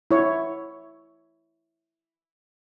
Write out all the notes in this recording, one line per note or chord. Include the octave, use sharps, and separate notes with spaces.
E4 C#5